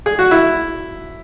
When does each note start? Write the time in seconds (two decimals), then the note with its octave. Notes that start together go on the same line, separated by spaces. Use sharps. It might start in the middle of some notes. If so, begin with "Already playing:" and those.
0.06 G#4
0.19 F#4
0.31 E4